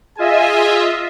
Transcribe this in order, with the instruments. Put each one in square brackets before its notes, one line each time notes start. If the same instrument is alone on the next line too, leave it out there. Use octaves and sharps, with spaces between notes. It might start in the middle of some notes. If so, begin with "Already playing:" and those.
[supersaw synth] F4 D#5 E5 [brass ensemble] G#4 G#5